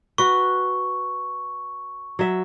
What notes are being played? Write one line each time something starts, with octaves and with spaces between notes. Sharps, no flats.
F#4 B4 C#6
F#3 E5